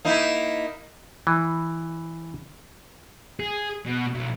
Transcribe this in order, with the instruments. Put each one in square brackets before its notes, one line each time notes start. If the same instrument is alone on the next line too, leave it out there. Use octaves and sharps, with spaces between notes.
[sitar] A#3 D#4 E4
[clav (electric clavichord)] E3
[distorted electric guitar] G#4
B2
B1